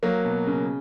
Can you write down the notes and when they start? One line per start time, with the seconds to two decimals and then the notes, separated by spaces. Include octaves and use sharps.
0.03 F#3 A#3
0.25 B2
0.47 C#3